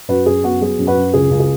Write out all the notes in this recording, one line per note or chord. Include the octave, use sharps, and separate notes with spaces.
F#2 F#4 B4
F#2 G#4
B3 F#4
F#3 G#4
F#2
F#4 B4
F#2
C#2 G#4
C#2
G#4